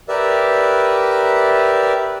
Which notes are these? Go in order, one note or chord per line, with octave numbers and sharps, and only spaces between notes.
G4 A#4 B4 D5 E5